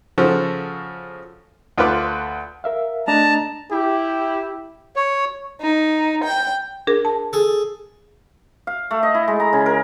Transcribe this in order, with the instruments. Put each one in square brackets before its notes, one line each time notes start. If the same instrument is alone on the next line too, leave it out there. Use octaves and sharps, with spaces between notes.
[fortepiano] C#3 F3 F#4 A4
D2 F4 A4 B4 D6
[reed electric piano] A#4 E5 F5
[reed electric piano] A3 D4 D#5 [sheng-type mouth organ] A5 A#5
[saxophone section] E4 [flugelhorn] G4
[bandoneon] C#5
[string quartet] D#4
G5
[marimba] D4 G#4 A#4
A5
[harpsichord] G#4 A4
[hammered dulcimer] F5
A3
D#5
E4
G#3
A#5
C#3
A#4